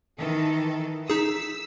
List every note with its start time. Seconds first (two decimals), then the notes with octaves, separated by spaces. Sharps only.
0.19 D#3 E3 A4
1.10 D#4 G#4 E6 B6